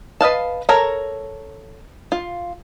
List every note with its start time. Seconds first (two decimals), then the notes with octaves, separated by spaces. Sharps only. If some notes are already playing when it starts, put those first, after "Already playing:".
0.21 B4 D#5 F5 A5
0.69 A4 A#4 C#5 A#5
2.12 F4